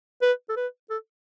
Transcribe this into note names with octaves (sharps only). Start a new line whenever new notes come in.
B4
A4
B4
A4